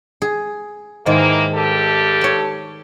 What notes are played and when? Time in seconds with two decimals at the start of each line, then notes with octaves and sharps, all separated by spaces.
0.22 G#4
1.06 G#2 D#3 E3 G#3 A#3
1.54 G2 G4 A4
2.21 C#5 A5